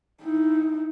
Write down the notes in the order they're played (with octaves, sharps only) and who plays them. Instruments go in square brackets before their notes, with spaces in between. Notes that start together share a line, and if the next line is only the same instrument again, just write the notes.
[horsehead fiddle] D#4 E4